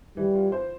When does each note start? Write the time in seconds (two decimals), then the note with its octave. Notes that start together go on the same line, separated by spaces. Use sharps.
0.17 E3 G3
0.35 F4
0.52 C5